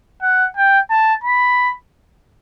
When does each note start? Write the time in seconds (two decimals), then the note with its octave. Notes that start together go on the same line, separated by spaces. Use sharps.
0.22 F#5
0.56 G5
0.90 A5
1.24 B5